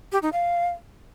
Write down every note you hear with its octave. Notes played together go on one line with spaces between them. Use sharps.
G4
D#4
F5